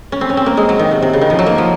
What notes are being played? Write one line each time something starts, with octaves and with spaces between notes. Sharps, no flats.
C#4
C4
C#4
C4
A#3
G#3
F#3
D#3
C3
C3
C#3
D#3
F3
F#3
A#3
F3